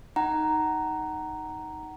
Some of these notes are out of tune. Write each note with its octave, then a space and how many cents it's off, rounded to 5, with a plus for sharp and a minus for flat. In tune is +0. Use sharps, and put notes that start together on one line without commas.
D#4 +0 F#5 +25 A#5 +0